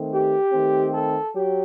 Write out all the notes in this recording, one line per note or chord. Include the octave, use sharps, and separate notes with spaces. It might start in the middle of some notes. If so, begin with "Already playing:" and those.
Already playing: D#3 A3 C4
G4
D#3 A3 C4
A4
F#3 G4